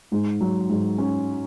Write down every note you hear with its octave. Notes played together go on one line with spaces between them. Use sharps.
G#2
F#3
G#2
C#4